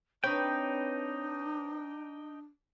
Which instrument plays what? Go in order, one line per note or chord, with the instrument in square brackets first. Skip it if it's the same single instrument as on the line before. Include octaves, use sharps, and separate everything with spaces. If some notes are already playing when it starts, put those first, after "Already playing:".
[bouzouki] C4 B4 C#5 [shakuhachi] D4 [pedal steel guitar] D#4 G5